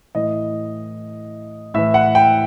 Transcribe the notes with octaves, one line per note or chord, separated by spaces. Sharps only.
A2 E3 D#5
A2 E3 E5
F#5
G5